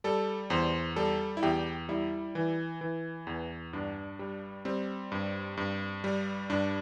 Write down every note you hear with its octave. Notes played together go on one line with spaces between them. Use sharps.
G3 A4
E2 C5
G3 A4
E4
E2 G4
G3 E4
E3
E3
E2
G2 D4
G3
G3 C4
G2
G2
G3
G2 D4